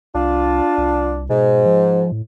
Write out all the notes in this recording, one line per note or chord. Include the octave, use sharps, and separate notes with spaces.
C2 D4 F4
C2
G#2 B2
F3
A2